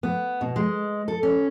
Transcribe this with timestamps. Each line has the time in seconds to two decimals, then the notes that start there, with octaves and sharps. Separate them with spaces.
0.03 B3
0.41 B2
0.56 G#3
1.08 A4
1.23 C#4